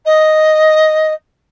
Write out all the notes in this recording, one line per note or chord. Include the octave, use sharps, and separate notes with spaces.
D#5